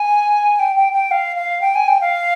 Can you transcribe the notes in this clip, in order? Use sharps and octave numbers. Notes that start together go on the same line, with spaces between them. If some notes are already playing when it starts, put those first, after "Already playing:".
Already playing: G#5
G5
G5
G5
F5
F5
G5
G#5
G5
F5